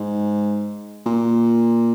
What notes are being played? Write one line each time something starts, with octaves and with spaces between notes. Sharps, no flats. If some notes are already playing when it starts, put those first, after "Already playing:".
Already playing: G#2
A#2